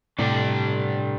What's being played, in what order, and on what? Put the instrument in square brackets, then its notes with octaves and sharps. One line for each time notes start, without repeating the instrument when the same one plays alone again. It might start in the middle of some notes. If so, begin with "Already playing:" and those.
[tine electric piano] A2 C3 [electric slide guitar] G3 D4 A4 D5